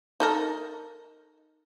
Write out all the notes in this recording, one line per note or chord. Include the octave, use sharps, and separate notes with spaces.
D#4 A4 A#4